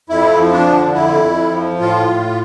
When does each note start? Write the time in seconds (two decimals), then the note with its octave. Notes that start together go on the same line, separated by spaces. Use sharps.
0.09 F2 E4
0.38 F3
0.52 D4
0.67 D3
0.94 F2 E4
1.24 F2
1.52 F3
1.80 A2 F4
2.08 A2